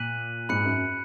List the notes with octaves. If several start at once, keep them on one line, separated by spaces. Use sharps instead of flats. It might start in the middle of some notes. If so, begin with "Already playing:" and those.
Already playing: A#2 F#6 B6 D#7 F#7
G#2 B5 F#6 C#7
F#2